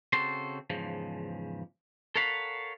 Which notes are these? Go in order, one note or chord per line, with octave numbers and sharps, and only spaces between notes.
C#3 C4 F#4 A4 C6
E2 G#2 C#3 F3
A4 A#4 C#5 F5 F#5 B5